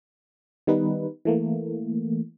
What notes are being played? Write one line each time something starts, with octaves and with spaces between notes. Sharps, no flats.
D#3 G3 B3 D#4 B4
E3 A3 A#3